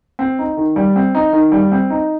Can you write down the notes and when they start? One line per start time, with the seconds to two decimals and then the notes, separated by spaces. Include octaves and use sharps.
0.19 C4
0.39 D#4
0.57 D#3
0.76 G3
0.96 C4
1.15 D#4
1.33 D#3
1.52 G3
1.72 C4
1.90 D#4